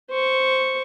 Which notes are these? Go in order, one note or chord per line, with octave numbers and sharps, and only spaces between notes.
C5 C#6